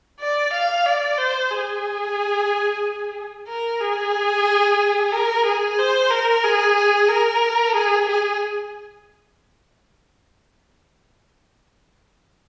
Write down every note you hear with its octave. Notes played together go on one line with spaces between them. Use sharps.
D5
F5
D5
C5
G#4
A#4
G#4
A#4
G#4
C5
A#4
G#4
A#4
G#4
G#4